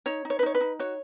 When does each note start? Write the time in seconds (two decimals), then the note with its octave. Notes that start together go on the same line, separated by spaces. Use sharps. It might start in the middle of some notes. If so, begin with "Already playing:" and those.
0.06 D#4 C#5
0.25 D#4
0.30 C#5
0.39 B4
0.43 D#4 C#5
0.55 B4
0.61 D#4
0.79 F#4 C#5